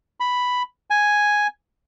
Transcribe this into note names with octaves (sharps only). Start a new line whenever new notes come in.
B5
G#5